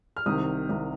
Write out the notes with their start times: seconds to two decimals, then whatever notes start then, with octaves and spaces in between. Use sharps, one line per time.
0.16 F6
0.26 C2 C3 D#3 D#6
0.69 C2 C3 D#3